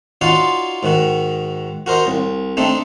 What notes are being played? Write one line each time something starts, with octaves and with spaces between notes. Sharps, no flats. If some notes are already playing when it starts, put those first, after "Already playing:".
D#4 F4 F#4 C#5 D5 C6
G#2 D#3 F#4
F#4 A#4 C5 D#5
C2
A3 C4 D4 D#4